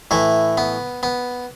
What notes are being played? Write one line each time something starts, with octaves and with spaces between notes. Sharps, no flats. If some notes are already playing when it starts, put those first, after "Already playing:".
A2 E3 E4
B3
B3